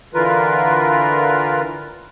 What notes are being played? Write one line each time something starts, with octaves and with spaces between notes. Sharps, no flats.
D3 E3 F4 A#4 B4